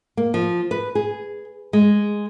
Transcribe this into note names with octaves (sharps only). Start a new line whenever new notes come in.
A#3
F3
B4
G#4
G#3